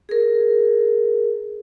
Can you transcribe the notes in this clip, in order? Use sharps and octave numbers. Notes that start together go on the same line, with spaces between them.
G#4 A#4